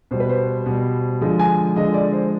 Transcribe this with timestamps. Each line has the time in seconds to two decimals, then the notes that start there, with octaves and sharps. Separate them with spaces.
0.11 B2 G3 C5
0.20 B4
0.29 C5
0.66 B2 G3
1.21 D3 F3 G#3
1.39 G#5
1.76 D3 F3 G#3 D#5
1.94 D5
2.13 C5